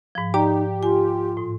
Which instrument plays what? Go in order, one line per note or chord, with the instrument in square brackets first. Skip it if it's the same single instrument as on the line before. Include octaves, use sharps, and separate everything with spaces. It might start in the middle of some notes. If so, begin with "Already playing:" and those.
[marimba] G#2 F3
[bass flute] D#4 [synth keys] G4 [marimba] D5 A#5
[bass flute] F4 [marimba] G#5
[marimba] A2